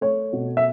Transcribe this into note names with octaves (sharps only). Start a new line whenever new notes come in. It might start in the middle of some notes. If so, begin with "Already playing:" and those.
A3 C#5
B2
E5